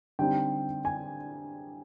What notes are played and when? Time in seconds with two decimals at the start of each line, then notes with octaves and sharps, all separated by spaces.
0.19 D3 G3 C4 D#4 G5
0.85 G#5